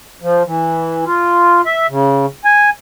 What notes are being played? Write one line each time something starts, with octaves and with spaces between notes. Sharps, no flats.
F3
E3
F4
E5
C#3
G#5